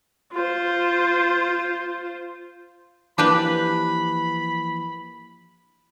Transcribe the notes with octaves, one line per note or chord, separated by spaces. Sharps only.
F4 C5
E3 F3 A#3 D4 G4 B4 B5